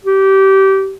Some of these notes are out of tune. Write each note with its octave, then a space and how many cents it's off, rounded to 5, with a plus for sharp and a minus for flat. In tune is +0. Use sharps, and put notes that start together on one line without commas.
G4 -25